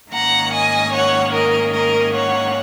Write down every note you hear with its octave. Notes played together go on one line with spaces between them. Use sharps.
G#2 D#3 A#3 C#4 F#5 A#5
D#5 G#5
C#5 F#5
A#4 D#5
A#4 D#5
C#5 F#5